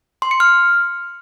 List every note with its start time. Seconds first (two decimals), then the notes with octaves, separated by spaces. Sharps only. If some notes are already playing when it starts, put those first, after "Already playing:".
0.22 C6
0.31 C#7
0.40 F6